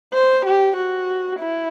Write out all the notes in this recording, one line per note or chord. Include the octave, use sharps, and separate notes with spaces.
C5
G4
F#4
E4